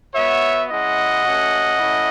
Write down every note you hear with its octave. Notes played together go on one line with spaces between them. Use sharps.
B3 F#4 C#5 E5
G#3 C#4 E4 D#5 F#5
A3 C#4 F#4
A3 C#4 E4